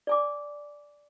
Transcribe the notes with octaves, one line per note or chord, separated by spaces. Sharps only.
D5 G#5 D6